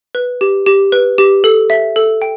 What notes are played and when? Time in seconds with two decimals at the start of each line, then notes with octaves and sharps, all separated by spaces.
0.15 B4
0.41 G4
0.66 G4
0.92 B4
1.18 G4
1.44 A4
1.70 E5
1.96 A4
2.22 G5